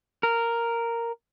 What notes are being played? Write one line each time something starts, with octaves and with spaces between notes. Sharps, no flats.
A#4